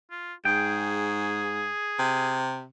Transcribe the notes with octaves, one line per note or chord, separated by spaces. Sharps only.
F4
G#2 G#4 G5
C3